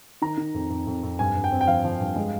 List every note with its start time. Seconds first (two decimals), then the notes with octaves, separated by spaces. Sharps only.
0.22 D#3 A#5
0.37 D#3
0.54 F2
0.70 F2
0.87 F2
1.03 F2
1.19 G2 G#5
1.35 G2
1.44 G5
1.52 C4
1.61 G5
1.67 F3 F5
1.84 F3
2.01 G2
2.16 G#3